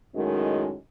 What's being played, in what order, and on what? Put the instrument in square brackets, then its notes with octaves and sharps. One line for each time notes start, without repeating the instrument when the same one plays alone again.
[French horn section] F#2 A2 D#3 G#3 C#4 F#4